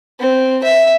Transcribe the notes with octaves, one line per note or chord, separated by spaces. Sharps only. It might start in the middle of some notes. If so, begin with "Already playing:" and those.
C4
E5